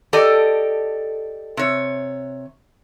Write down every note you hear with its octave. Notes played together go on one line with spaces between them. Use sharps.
G4 A4 D5 D#5
C3 C#5